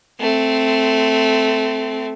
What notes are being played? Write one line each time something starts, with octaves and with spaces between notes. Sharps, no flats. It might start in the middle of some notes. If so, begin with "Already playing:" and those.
A3 C4